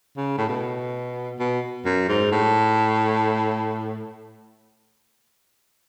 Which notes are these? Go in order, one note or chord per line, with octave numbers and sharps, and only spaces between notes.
C#3
A2
B2
B2
F#2
G#2
A2